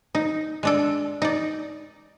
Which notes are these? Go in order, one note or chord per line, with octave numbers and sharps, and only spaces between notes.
D#4
G#3 D4 A4
D#4 D5